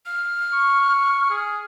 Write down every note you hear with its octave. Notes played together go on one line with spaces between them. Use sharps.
F6
C#6
G#4